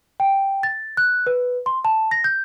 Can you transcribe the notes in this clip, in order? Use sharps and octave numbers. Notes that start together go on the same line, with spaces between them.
G5
A6
F#6
B4
C6
A5
A#6
G6